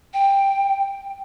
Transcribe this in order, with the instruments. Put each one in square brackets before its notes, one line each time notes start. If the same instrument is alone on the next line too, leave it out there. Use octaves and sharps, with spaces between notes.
[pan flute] G5